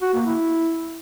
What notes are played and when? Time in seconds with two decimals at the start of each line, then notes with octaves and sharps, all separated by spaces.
0.02 F#4
0.14 A#3
0.26 E4